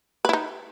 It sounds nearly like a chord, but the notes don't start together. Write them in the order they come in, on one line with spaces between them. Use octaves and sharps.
B4 E4 D#4